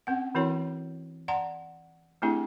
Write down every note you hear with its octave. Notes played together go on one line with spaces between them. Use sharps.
C4 C#4 F#5
E3 C4 E4 F#4 A#4 C#5
D5 F#5 A5 A#5 C6
A3 C4 D4 E4 G4 G#4